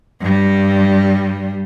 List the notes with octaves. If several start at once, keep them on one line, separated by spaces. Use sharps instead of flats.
G2 G3